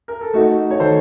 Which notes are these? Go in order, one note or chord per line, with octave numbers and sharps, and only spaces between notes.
A#4
A4
A3 D#4 F#4
C#5
D#3 A4 C5